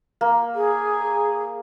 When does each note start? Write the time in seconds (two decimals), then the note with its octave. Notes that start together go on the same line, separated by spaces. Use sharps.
0.21 A#3
0.55 G#4